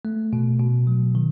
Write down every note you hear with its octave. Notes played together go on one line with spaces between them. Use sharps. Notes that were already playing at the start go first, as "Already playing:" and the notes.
A3
B2
B2
F#3
D#3